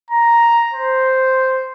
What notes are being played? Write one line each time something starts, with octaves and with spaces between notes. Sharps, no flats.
A#5
C5